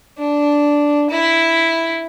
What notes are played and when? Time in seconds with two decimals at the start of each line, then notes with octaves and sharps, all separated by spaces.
0.18 D4
1.09 E4